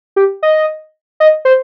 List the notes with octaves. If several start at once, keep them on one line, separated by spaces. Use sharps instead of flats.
G4
D#5
D#5
C5